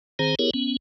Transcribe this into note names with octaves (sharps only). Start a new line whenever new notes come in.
D#3 C4 G#4 C5 A#5
B3 E4 G4 G#4 A#4 C#5
B3 C#4